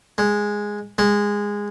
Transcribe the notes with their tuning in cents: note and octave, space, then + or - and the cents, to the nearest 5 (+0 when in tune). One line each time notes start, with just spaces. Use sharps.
G#3 -5
G#3 -15